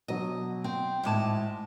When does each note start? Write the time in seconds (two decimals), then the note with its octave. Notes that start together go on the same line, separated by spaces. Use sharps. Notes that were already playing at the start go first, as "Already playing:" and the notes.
0.08 B2 F#3 D4 D#5
0.64 C4 G5
1.03 G#1 A2 G#3 A5 D6